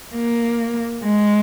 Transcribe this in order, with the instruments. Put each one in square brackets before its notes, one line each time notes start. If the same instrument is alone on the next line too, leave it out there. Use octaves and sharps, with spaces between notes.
[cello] A#3
G#3